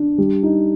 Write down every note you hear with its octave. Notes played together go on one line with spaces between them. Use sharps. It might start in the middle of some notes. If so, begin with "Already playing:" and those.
Already playing: D4
G3
D#4